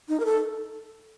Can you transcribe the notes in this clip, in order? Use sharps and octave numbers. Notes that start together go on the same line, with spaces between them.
D#4
A#4
A4